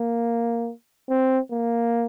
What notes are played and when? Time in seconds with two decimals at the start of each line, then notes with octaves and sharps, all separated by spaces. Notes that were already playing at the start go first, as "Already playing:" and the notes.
Already playing: A#3
1.09 C4
1.51 A#3